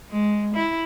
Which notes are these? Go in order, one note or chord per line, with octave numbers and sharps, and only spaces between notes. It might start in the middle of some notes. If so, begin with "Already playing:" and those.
G#3
E4